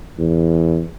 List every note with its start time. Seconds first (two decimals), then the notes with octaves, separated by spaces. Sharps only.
0.19 E2